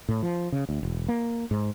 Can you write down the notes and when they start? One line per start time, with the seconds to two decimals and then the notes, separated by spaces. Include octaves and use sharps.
0.09 A2
0.23 F3
0.52 C#3
0.69 D2
0.83 E1
1.08 A#3
1.51 G#2